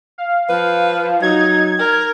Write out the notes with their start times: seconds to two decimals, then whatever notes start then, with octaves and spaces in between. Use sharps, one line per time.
0.18 F5
0.49 F3 B4
1.22 F#3 D#4 G#6
1.79 A#4